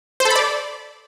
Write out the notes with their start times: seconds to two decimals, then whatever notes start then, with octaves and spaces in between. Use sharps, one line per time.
0.20 C5
0.25 A4
0.30 B5
0.36 D5